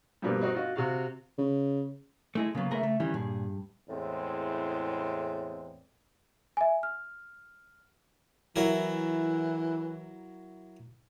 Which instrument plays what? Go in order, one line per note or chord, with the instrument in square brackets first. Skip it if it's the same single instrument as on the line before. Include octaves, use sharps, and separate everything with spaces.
[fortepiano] G2 B2 F3 G3 A#3 B3
C4 D#4 F#4
F4 F#4 D#5
C3 F#4 F5
[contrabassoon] C#3
[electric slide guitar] G#3 G#4 [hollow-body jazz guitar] A3 E4 D#5
[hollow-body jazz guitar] C#3 F#3 [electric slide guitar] A#3 B3 F4
[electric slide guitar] C#3 B4 E5 [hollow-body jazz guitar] A3 G#4 A#4
[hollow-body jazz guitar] A3
[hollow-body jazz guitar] D#3 E3 G3 [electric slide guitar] C#4
[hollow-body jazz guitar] G2 [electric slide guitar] A#2 G#4
[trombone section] E2 G#3 C4 [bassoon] A2
[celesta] E5 G#5
F6
[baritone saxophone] E3 [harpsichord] F#3 E4 A#4